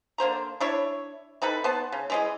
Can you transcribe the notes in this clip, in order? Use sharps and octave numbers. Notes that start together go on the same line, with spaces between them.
D3 A#3 C5 A#5
D4 E4 C#5
C4 D#4 A4 B4
B3 C5 A5
C#3
E3 G#3 D#5